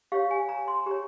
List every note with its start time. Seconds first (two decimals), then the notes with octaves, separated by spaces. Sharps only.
0.12 G4 C#5 F5
0.31 G#5
0.49 A#5
0.68 C6
0.86 G4 A#5
0.91 C#5